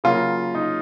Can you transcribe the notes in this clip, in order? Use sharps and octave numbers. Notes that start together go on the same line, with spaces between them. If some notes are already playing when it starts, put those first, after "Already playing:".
C#3 F#3 A#3 F4
D#4